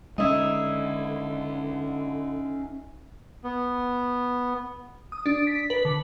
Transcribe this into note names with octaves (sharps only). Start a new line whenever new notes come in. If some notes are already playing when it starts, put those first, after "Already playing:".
D3 G#3 C#4 D#4 E4
B3
D#6
D4
B6
B4
D3